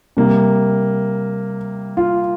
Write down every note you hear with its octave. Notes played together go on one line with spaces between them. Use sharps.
C3 G3 A#3
F4